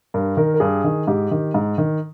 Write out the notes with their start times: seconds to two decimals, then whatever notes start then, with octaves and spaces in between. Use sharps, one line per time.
0.14 G2 A#4
0.37 D#3 A#4
0.54 A#4
0.60 G2 G#4
0.84 D#3
1.07 G#2 G4
1.31 D#3
1.54 G#2
1.78 D#3